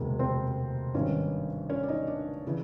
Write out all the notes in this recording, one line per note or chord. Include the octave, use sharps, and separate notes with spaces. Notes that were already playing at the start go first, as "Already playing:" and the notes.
Already playing: E1 D2 C3 D#3 G#3 A#3 A#4
C4 C5
G#1 G2 D#3 C#4 C#5
C#4 C#5
D5
D#4 D#5
D4 D5
C#3 E3